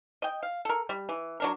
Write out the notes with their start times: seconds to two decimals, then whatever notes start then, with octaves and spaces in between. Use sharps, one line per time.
0.22 D#5 G5
0.43 F5
0.65 A4 A#4
0.89 G3
1.09 E3
1.40 F#3 D4 A#4